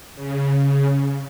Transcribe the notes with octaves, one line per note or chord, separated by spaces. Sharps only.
C#3